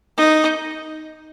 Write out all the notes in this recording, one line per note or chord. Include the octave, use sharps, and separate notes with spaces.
D#4